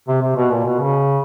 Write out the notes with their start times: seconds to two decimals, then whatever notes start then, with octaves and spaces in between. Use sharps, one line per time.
0.08 C3
0.21 C3
0.36 B2
0.51 A#2
0.65 B2
0.79 C#3